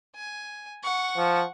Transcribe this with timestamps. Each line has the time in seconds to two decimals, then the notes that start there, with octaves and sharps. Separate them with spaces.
0.15 G#5
0.83 F#5 C#6
1.17 F3